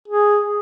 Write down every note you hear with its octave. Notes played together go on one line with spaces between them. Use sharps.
G#4